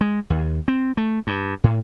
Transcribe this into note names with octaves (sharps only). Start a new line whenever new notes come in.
G#3
D#2
C4
A3
G2
A2